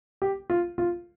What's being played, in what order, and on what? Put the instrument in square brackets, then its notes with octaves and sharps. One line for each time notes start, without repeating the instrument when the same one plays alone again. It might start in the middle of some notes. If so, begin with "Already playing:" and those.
[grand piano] G4
F4
F4